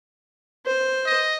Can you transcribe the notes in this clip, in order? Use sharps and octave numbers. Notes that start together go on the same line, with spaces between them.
C5
D#5